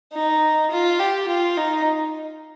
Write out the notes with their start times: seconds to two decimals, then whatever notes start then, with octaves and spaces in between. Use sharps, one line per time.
0.13 D#4
0.71 F4
0.99 G4
1.28 F4
1.57 D#4